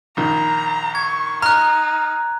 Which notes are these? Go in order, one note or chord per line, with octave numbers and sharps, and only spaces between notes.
A#1 D#3 A#5
C#6 G#6
D#4 A#5 F6 F#6